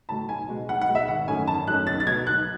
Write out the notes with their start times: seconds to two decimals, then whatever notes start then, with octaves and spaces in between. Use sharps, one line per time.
0.09 A2 F#3 A5
0.29 B1 G#5
0.49 B2 G#3
0.69 B1 F#5
0.81 F#5
0.88 B2 G#3
0.95 E5
1.08 G#1 F#5
1.28 F#2 D#3 A3 C#4 G#5
1.47 G#1 A5
1.67 F#2 D#3 A3 C#4 F#6
1.87 B1 A6
2.00 A6
2.06 B2 F#3 G#6
2.27 B1 F#6